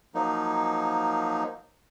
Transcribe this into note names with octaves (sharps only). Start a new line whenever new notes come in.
F3 F#3 A#3 D#4